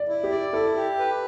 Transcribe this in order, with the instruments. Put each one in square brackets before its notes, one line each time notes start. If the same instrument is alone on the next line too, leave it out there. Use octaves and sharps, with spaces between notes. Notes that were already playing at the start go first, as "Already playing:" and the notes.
Already playing: [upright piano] D5
[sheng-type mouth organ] E4
[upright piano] G4
[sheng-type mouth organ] D5
[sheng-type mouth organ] E4 [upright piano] A4
[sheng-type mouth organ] G4
B4